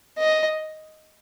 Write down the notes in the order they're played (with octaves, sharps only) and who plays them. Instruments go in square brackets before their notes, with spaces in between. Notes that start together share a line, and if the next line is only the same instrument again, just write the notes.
[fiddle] D#5